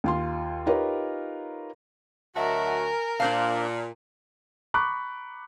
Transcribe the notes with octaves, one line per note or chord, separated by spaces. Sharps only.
D#2 F4 C6
D#4 F4 G4 A#4 B4 C#5
D2 F#3 F#4 A#4 D#5 E5 A5
G#5
A#2 D4 C5 F5 A5
A#5 B5 C#6 D6 F#6